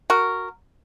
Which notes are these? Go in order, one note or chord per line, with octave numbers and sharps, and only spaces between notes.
F#4 A#4